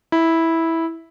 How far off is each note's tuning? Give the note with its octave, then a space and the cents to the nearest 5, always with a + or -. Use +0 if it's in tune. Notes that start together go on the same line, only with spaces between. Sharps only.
E4 -10